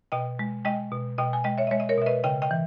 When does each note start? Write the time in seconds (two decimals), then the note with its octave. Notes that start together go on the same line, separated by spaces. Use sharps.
0.12 B2 D#5 G5
0.39 G#3
0.65 G#3 D#5 G5
0.92 B2
1.18 B2 D#5 G5
1.33 G#5
1.44 G#3 D#5 G5
1.58 C#5 E5
1.67 D#5
1.71 G#3 C#5 E5
1.80 D#5
1.89 A#4 C#5
1.98 B2 E5
2.06 B4 D#5
2.24 C#3 D#5 G5
2.42 D#5 G5
2.51 E3